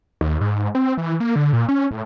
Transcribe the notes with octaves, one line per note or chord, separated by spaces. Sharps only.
D#2
G#2
C4
E3
A#3
D3
A#2
C#4
A2